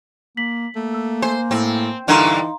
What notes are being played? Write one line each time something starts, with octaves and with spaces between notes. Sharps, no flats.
A#3 B6 F#7
A3 A#3
E6
C5 G#5
A2 C4
G2 D3 E3 A#3 D#4 F5 A#5 C6